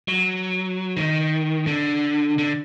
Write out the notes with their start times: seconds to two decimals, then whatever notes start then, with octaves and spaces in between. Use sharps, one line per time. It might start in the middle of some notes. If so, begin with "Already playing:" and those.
0.08 F#3
0.97 D#3
1.67 D3
2.38 D3